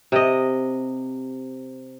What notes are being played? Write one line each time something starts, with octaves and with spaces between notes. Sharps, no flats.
C3 D#5